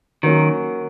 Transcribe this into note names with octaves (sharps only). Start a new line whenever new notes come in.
D#3 F#3 A#3 C#4 F#4